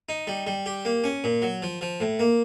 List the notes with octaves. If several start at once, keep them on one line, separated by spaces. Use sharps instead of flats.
D#4
G3
G3
G4
A#3
C#4
A#2
F#3
F3
F3
A2
A#3